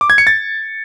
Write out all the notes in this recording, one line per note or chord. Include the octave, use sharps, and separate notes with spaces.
D6
G#6
C#7
A6